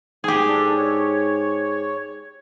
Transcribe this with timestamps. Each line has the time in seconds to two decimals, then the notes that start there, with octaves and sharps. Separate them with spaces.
0.24 G#2 G4 G#4
0.48 D4 A4
0.78 C#5